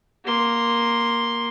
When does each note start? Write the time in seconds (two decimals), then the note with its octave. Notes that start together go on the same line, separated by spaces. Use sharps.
0.25 A#3 C6